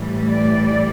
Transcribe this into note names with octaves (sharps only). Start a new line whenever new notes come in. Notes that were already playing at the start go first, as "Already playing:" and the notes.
Already playing: A2 E3 G3
D5